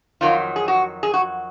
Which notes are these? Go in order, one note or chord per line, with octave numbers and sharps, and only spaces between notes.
F2 D#3 F#3 F4
G#4
F#4
G#4
F#4